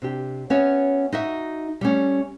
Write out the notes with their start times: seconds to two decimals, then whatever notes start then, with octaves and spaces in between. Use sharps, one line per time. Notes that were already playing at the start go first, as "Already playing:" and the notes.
0.02 C3 D4 G4
0.50 B3 C#4 F#4 C#5 E5
1.13 D#4 F#4 E5
1.81 G3 A3 C#4